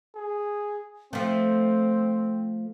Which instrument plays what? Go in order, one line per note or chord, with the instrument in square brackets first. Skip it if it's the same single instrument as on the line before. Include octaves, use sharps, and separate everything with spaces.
[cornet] G#4
[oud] F3 A3 [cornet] C4